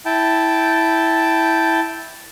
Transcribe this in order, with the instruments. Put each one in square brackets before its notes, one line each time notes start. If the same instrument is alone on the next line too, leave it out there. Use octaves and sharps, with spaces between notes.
[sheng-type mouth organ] E4 G5 A5